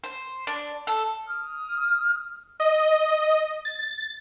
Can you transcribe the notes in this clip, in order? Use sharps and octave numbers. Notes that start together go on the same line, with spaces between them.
C5
D4
A4
D#6 F6
D#5
A6